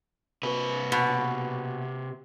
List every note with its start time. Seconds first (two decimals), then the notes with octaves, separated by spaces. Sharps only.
0.43 C3 B4
0.92 B2